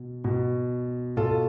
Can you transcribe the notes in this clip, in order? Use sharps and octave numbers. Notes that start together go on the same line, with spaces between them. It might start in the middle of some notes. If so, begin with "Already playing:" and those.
Already playing: B2
B2
B2 F4 A4